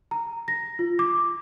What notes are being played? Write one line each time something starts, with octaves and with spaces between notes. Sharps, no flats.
A#5
A#6
F4
D6